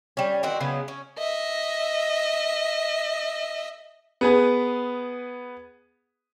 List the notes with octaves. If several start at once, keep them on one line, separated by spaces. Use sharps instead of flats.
G3 C#4
D#3 C4 F#4
C#3 F#3 B3
C#4
D#5 E5
B3 G#4 B4